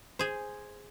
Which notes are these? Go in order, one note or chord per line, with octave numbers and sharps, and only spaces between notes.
G#4 C5